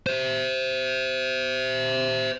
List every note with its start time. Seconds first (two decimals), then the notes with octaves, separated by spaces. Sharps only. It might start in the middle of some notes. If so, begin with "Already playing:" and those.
0.07 C5 E5